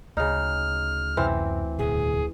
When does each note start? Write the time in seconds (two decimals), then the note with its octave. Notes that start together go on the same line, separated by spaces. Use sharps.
0.17 D2 C#3 D#4 F6
1.17 F#2 C3 E3 C4
1.78 D1 E2 B2 G#4